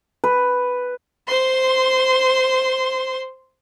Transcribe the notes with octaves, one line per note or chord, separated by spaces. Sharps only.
B4
C5 C6